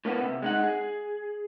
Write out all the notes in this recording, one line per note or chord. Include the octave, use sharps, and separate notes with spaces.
A2 A#3 B3
C3
G#3 D#4 F#5
G#4